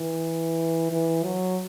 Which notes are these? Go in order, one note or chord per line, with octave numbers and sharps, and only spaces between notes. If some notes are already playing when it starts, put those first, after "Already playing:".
Already playing: E3
E3
F#3